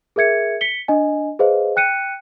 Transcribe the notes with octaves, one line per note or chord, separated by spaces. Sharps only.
G#4 A#4 E5 G#6 C#7
B6 C#7 G7
D4 D#5 G#5
G#4 B4 C5 D#5 F5
G5 F#6 C#7 D#7